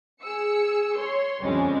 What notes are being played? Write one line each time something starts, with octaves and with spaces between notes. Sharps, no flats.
G#4 E6 C#7
C#5 C6
F2 D3 G3 G#3 C#4